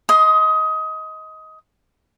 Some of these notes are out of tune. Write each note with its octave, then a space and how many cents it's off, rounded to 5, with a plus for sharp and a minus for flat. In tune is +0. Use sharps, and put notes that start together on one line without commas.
D#5 +20 C6 +0 D#6 +0